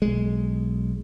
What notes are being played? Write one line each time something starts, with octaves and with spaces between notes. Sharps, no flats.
B1 G#3